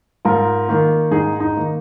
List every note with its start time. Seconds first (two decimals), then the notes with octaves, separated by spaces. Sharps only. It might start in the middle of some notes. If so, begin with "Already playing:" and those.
0.25 G#2 F4 A#4
0.68 D#3 A#3
1.11 G#2 D#4 G#4
1.40 D#4
1.56 D#3 A#3